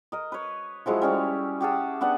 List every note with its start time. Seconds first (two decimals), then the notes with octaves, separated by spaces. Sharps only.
0.12 A#4 D#5
0.32 B4 C#5
0.86 F3 F#3 G#3 E4
1.02 G3 C#4 G#4
1.61 G4 G#4 F#5 A5
2.01 B3 D4 F#5